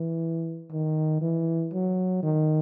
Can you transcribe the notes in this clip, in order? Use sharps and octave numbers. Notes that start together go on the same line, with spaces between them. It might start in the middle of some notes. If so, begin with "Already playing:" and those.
Already playing: E3
D#3
E3
F#3
D#3